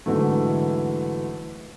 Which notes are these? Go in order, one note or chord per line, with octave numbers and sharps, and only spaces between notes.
G#2 D3 E3 F#3 A3